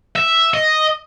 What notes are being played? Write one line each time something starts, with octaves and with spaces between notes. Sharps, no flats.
E5
D#5